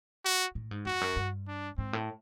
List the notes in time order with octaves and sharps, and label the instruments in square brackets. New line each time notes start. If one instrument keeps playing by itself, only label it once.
[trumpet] F#4
[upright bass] A2
G#2
[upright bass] F2 [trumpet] F#4
[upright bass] F#2
G2
[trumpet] D4
[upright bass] G#2 [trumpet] C4
[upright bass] A2